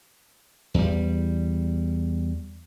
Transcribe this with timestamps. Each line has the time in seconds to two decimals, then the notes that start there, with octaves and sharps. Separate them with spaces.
0.74 E2 G3